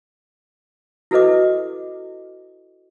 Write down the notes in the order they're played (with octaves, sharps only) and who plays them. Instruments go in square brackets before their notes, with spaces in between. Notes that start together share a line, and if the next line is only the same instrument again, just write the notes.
[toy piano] E4 F#4 A4 B4 D#5 D6